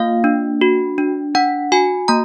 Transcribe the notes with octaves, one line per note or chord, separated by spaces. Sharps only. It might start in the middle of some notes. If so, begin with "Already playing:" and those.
Already playing: A#3 F4 F5
D4
F#4
D4
D4 F#5
F#4 G#5
A#3 A#5